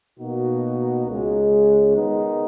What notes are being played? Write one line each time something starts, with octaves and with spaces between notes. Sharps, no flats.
B2 A#3 D#4 F#4
C#2 C#3 G#3
D#3 G#3 B3 D#4